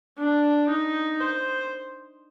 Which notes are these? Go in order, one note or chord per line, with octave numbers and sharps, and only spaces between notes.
D4
D#4
C5